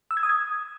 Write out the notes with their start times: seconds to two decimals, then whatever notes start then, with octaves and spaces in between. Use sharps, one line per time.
0.11 E6
0.17 G#6
0.23 D#6
0.29 G#6